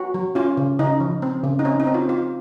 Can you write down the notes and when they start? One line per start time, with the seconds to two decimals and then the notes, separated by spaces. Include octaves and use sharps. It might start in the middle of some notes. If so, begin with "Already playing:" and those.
Already playing: F#4
0.14 F#3
0.35 C#4 F4
0.57 C#3
0.79 C#3 D#4
1.00 F3
1.22 C4
1.44 C#3
1.59 D#4
1.65 C4 C#4
1.80 D#4
1.87 C4
1.94 F4
2.08 C4 F4